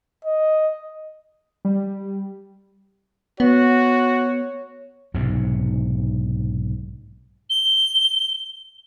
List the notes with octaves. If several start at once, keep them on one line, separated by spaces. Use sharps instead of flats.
D#5
G3
B3 F#4 C#5
B1 G#2 C3
G7